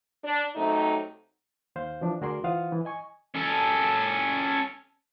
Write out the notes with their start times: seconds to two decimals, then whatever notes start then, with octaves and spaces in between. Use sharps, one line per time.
0.24 D4
0.56 C3 F#3 A3 D#4
1.76 D#2 C5 F5 G6
2.01 E3 F3 D4
2.21 D2 F#4 G#4 A#4 D5 C6
2.44 E3 F4 C5 F5 F#5 D#6
2.72 E3
2.85 D#5 G#5 C#6
3.35 C#4 A4